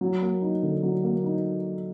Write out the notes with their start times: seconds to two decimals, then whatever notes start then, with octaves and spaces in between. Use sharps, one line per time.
0.01 F#3
0.22 A#3
0.42 D#4
0.63 D3
0.83 F#3
1.04 A#3
1.24 D#4